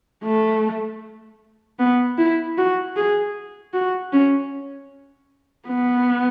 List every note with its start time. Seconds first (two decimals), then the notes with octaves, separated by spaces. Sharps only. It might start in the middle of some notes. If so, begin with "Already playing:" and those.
0.24 A3
1.79 B3
2.18 E4
2.57 F#4
2.96 G#4
3.73 F#4
4.12 C#4
5.68 B3